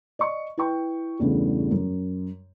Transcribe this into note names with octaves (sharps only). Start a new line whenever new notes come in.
D5 D#5 C#6
E4 B4 G5 C#6
E2 G2 C#3 G3 A3 B3
F#2